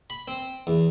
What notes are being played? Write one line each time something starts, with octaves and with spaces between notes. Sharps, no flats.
B5
C4
E2